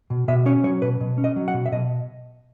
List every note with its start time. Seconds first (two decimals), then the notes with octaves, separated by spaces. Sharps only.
0.10 B2
0.28 B2 E5
0.46 C#4 C#5
0.64 F#3 C#5
0.82 B2 B4
1.00 B2
1.18 C#4
1.24 D#5
1.36 F#3
1.48 F#5
1.54 B2
1.66 E5
1.72 B2 D#5